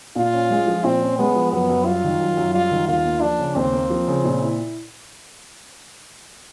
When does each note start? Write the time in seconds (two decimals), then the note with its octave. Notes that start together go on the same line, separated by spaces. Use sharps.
0.16 A#2 F4
0.33 C#4
0.51 G#3
0.67 F3
0.84 A#2 C4
1.02 C#4
1.19 G#3 B3
1.36 F3
1.52 F#2 B3
1.69 F#2
1.86 G3 F4
2.04 D#3
2.20 F#2
2.37 F#2
2.54 G3 F4
2.71 D#3
2.88 D#2 F4
3.05 A#3
3.22 F3 D4
3.39 C#3
3.56 D#2 C4
3.73 A#3
3.90 F3
4.08 C#3
4.25 A#2
4.41 E4